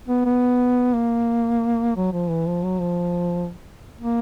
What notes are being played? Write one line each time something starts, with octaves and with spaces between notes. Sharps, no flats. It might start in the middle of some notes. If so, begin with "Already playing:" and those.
B3
B3
A#3
F#3
F3
E3
F3
F#3
F3
A#3